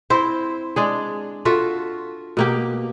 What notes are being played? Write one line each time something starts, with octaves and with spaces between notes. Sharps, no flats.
C4 E4 C5
G#3 D4 G#4
F4 F#4 A4 E5
B2 A#3 G4